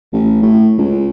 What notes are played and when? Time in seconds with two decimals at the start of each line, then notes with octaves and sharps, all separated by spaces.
0.13 A1
0.42 A2
0.78 C#2